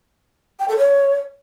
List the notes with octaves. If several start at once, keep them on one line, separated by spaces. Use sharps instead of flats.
G5
A4
C#5